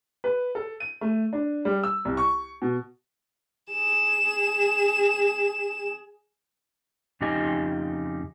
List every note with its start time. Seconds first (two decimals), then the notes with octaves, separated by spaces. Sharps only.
0.24 B4
0.55 A4
0.80 D#7
1.01 A3
1.33 D4
1.65 G3
1.84 E6
2.05 C2
2.17 C#6
2.62 B2
3.72 G#4 E7
7.21 F2 C#3 D#4 G4 D#5 G#5